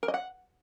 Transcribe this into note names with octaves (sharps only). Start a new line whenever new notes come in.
A#4
D#5
F#5